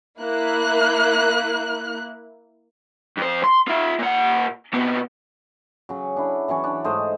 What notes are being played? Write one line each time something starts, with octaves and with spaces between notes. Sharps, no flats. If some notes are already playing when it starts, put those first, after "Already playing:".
A#3 E4 F#6
F2 C5
C6
F4 E5
A#2 F#5
C3 B3
C#3 F#3
D4 E4
E3 F#3 C#4 C#5
D4
G#2 A3 C5 D#5